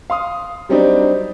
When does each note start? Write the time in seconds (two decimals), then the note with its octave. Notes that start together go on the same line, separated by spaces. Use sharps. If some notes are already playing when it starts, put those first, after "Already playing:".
0.10 F5 C6 D#6
0.69 F#3 G3 C4 D4 D#4